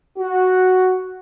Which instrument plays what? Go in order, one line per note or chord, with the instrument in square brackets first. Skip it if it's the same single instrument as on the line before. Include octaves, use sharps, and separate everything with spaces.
[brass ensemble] F#4